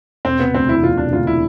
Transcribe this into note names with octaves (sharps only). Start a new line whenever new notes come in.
E1 C4
C3 B3
D2 C4
E3 E4
E1 F4
C3 D4
D2 F4
E3 E4